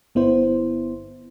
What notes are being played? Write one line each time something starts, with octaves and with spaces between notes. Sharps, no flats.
G1 B3 E4 C5